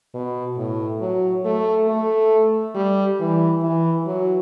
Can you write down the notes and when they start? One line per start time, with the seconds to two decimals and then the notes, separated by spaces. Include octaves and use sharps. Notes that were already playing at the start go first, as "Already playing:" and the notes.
0.14 B2
0.57 A2
1.01 F#3
1.45 A3
1.88 A3
2.75 G3
3.20 E3
3.63 E3
4.06 F#3